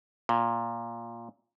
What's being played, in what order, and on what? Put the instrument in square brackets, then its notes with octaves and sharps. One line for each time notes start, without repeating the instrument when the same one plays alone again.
[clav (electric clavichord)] A#2